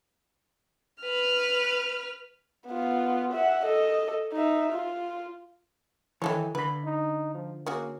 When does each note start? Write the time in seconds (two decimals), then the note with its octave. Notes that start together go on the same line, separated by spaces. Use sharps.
1.01 B4 F6
2.68 B3 F4
3.32 E5 F#5
3.65 A4 D#5
4.33 D#4 E5
4.73 F4
6.22 D#3 E3 E4 A4 C#5
6.55 D3 B4 B5
6.85 D#4
7.34 F3
7.66 A#3 C#4 F#4 G#4